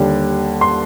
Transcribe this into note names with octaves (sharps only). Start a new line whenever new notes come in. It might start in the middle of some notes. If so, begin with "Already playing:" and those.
Already playing: D#2 D3 G3
C6